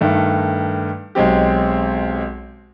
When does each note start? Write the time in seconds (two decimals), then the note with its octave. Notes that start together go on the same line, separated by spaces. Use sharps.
0.01 G2 D#3 A3
1.15 B1 G#3 C4 G4